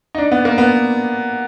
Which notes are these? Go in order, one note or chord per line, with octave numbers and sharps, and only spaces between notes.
D#4
D4
B3
A#3
B3